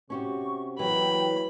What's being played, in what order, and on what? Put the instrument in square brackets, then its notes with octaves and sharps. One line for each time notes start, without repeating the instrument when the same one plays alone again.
[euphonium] C3 [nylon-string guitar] C#4 F#4 G4 [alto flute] C#6
[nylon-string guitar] E3 [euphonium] F#3 [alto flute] G5 [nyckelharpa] B5